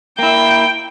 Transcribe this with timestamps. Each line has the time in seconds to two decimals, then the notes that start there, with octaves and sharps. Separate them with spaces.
0.19 A#3 E4 G5